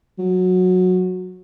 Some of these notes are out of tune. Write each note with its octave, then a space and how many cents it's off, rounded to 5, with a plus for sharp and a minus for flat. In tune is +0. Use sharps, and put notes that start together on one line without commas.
F#3 -15